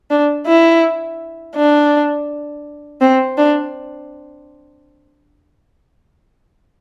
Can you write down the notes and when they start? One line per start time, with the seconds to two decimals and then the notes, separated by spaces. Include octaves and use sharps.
0.11 D4
0.47 E4
1.56 D4
3.01 C4
3.38 D4